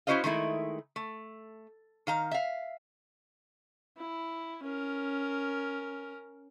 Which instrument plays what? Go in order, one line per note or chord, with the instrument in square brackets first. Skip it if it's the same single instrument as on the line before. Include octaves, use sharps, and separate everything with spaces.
[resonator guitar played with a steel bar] C#4 E4 F#4 C5 D#5 F5
D#3 G#3 A3 E4
A3
D#3 F5 A#5
E5 F5
[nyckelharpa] E4
C#4 A#4